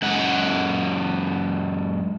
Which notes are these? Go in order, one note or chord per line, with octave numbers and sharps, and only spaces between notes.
F#2 G#3 F#5